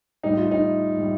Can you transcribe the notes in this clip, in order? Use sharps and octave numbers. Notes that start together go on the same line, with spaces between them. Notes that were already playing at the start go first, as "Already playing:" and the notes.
A2 G3 D#4
F4
D#4
A2 G3